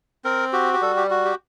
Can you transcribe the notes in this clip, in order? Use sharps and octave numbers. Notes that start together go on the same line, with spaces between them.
C4 A#4
F#4 G4
G4
G3 A4
G4
F#4
G4